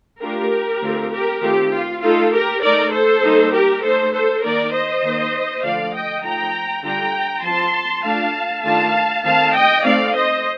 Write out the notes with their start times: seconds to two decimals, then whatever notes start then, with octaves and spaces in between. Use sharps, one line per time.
0.21 A3 D4 F4 G4 A#4
0.81 D3 A3 C4 F4
1.12 G4 A#4
1.42 D#3 A3 C4 F4 G4
1.71 F4
2.01 A3 D#4 F4 A4
2.32 G4 A#4
2.62 A3 D#4 A#4 D5
2.92 A4 C5
3.22 G3 A#3 D#4
3.52 G4 A#4
3.82 A3 D#4 A4 C5
4.12 A4 C5
4.42 D#3 A#3 D#4 A#4 D5
4.73 C5 D#5
5.03 D#3 A#3 D#4
5.62 D3 F3 A3 D5 F5
5.93 D#5 G5
6.23 F3 A3 D#4 G5 A#5
6.83 D3 G3 D4 F4 G5 A#5
7.43 F3 C4 F4 A5 C6
8.03 A3 D4 F4 F5 A5
8.63 D#3 A3 D4 F4 F5 A5
9.24 D#3 A3 C4 F5 A5
9.54 D#5 G5
9.84 A3 C4 D#4 D5 F5
10.14 C5 D#5